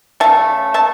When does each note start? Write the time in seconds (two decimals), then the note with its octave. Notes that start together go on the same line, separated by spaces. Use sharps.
0.20 C#3 A3 C#4 E5 A5
0.74 E5 A5